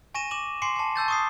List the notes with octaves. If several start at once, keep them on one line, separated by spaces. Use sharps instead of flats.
G#5 C#6 A#6 D#7 E7
D6 E7 F#7
G#5 C6 D6 C7 C#7
G#5 A5
A5 E6 G6 A6
C#6 D#6 C7